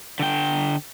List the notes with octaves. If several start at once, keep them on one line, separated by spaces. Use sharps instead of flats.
D3 G5